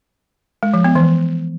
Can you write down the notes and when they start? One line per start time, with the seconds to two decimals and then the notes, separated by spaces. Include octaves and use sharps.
0.63 G#3
0.74 F3
0.84 B3
0.95 E3